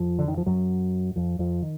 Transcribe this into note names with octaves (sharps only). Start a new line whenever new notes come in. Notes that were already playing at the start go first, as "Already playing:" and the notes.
Already playing: F2 F3
D3
D#3
F3
F#2 F#3
F2 F3
F2 F3
D#3